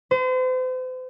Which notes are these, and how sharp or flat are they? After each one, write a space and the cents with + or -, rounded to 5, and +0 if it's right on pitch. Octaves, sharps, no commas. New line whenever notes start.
C5 -40